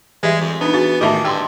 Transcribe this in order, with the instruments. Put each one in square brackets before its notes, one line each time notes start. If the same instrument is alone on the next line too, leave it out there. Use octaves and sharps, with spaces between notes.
[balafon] E3 E5 [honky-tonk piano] G3 [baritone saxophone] G#3
[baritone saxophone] F2
[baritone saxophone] B3 [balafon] D4 D#4
[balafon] F#4 [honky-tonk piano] G#4 A6
[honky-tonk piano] A2 D#3 [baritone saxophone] A#3 [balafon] D#5 E5 A5
[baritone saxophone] G2 [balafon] G5 [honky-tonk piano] C6 E6